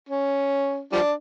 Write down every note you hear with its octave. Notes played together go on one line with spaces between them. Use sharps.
C#4
F3 G3 D4